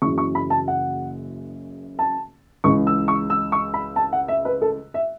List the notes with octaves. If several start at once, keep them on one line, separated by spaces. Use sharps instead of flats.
F#1 F#2 C#3 E3 C#6
C#6
B5
A5
F#5
A5
C#2 C#3 E3 C#6
E6
C#6
E6
C#6
B5
A5
F#5
E5
B4
A4
E5